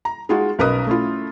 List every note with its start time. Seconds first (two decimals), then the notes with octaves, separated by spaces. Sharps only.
0.05 A#5
0.29 G#3 D#4 F4 F#4 G#4
0.59 B1 C#4 A#4 B4 D#5 D#6
0.87 A3 C#4 E4 F4